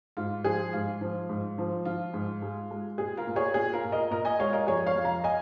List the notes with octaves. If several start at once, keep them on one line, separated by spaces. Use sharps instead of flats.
G#2 F4
F3 G#4
G#2 F4
F3
G#2
F3
F3 F4
G#2
G#3
G#3
A#2 G#4
F4 A#4
A#2
G#4 C#5
A#2 G#4
F4 A#4
A#2
A#4 D#5
A#2 A#4 D#5
D#5 G#5
G#3 C#5 F5
A#4 D#5
F2 G#4 C#5
C#5 F5
F2
F5 A#5
D#5 G#5